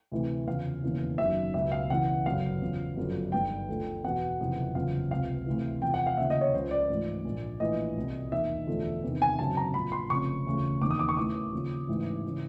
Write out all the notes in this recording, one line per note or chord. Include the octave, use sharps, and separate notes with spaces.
D2 C3 E3
E2 C#3 F3 F5
E1 D#2 C#3 E3
F#1 F#2 D#3 E5
C#2 B2 E5
F5
E1 E2 C#3 E3 F#5
G1 F#2 C#3 F5
E2 C#3 F3
G1 F#2 D3 F3
G1 G2 D#3 G5
D2 D3 F3
E2 B2 F#5
F#1 F2 C3 E3
F#1 E2 C#3 F3 F5
C#2 C3 F3 F5
D2 C3 E3
E2 C3 F3 G5
F#5
F5
D#2 C#3 F3 E5
D#5
C#5
C#2 C#3 F3 C5
D5
A1 G#2 F3
A#1 A#2 F3
A#1 A2 E3 D#5
C2 B2
E1 D#2 D#3 E5
E1 D2 D3 F3
E2 C3 D#3
G#5
G#1 F#2 C#3 A5
A#5
A#1 A#2 F3 B5
C6
F1 F2 C#3 F3 C#6
E1 D2 C#3 F3
E1 D#2 D#3 D6
D#6
D6
C#6
A1 A2 E3 D6
D#2 C#3 F3
A1 G#2 E3
C#3 E3